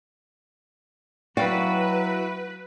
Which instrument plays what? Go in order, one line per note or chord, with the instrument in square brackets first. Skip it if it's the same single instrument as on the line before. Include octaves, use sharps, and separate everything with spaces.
[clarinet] F#3 [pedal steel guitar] E4 F#4 [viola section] B4 [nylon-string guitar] D5 F5 G5